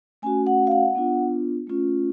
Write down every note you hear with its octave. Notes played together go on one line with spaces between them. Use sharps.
A3 C#4 F#4 G#5
F#5
F5
F#5
B3 D4 F4
A3 C#4 F4